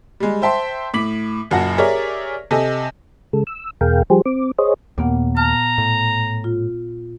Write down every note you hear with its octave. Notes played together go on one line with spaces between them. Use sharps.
G3 G#3
C5 E5 G5 A5 C6
A2 D6 B6 F#7
F#1 F#2 A#2 F#5 A5 A#6
G4 G#4 A#4 C#5 D5 E5
C3 A4 D#5 G#5
C#3 G#3 A4
E6
E2 B2 G#4 A#4 F5 G5
F3 G3 G4 G#4 C5
C4 D6
G#4 C5 C#5 D#5
D#2 A#2 A#3 B3 F#5
A5 A#5 F6
A2
F4